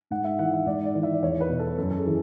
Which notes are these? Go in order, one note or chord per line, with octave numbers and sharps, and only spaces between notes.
G#2 F#5
E5
E3 F#5
E5
G#2 D5
D5
E3
E5
D5
E2 C#5
B4
B2
A4
F#2 A4
A4
G#4
E3